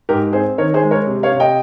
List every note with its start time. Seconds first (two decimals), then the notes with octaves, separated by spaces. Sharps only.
0.09 G#2 G4 A#4
0.33 C4 G#4 C5
0.58 D#3 A#4 C#5
0.74 G#4 C5
0.82 G#3
0.91 A#4 C#5
1.07 C3
1.23 C#5 F5
1.32 C3
1.40 D#5 G5